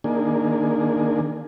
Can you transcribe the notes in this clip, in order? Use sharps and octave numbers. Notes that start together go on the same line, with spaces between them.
D#3 A#3 D4 G#4